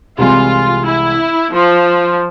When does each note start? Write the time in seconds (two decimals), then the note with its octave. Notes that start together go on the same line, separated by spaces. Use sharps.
0.18 C2 C3 E3 G#3 F4
0.86 E4
1.53 F3